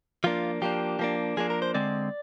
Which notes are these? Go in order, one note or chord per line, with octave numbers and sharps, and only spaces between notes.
F3 A#3 D4 F4
F3 A#3 D4 G4
F3 A#3 D4
F3 A#3 D4 G#4
A#4
C5
D3 G#3 C4 D5